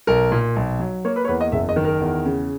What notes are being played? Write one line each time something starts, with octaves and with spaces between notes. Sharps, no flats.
B1 A#4
A#2
B1
F#3
A#3 C#5
B4
C#5
E2 B4
D#5
F#1 E5
D#5
D#3
A#4
E2
C#3